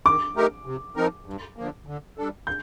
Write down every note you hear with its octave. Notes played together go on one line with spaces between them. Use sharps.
D#3 D6
A3 D#4 G4 A#4
C3
F3 C4 D#4 A#4
G2
D3 F3 A#3
D3
G3 D4 A4
G6